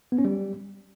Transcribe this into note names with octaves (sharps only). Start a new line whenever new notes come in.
B3
C#4
G3